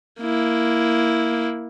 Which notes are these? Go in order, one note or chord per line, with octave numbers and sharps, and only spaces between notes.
A#3 E4